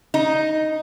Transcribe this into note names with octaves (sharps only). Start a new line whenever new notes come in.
D#4